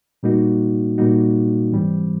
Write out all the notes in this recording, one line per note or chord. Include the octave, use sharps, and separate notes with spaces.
A#2 G3 A#3 D#4 F#4
A#2 G3 A#3 D#4 F#4
G#2 E3 G3 C4